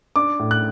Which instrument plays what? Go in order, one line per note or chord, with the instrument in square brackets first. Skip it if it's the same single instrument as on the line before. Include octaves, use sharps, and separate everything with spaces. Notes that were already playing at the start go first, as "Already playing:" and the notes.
[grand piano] D4 D6
A2
F#6